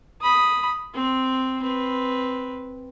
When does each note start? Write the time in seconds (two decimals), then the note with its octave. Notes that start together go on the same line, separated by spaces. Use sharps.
0.22 B5 D#6
0.94 C4
1.62 C4 B4